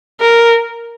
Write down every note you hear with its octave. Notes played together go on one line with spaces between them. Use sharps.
A#4